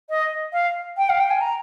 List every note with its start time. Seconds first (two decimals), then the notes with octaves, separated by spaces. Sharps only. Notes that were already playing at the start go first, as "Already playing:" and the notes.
0.09 D#5
0.53 F5
0.97 G5
1.09 F5
1.20 G5
1.30 G#5
1.41 A#5